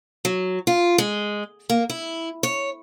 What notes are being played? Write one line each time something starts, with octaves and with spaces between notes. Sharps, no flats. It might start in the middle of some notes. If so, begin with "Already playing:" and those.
F#3
F4
G#3
A#3
E4
C#5